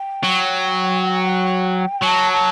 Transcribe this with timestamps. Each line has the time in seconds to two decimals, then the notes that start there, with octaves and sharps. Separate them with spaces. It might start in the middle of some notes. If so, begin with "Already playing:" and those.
Already playing: G5
0.24 F#3
2.02 F#3 A5
2.32 A5